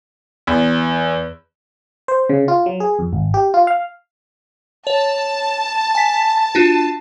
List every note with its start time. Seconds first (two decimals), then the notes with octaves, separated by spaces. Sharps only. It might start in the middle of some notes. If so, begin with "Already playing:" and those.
0.47 E2
2.08 C5
2.29 C#3
2.48 F4
2.66 F#3
2.80 G#4
2.99 F2
3.13 G#1
3.34 G4
3.54 F4
3.67 F5
4.87 C#5 A5
5.95 G#5 B6
6.55 D4 F4 F#4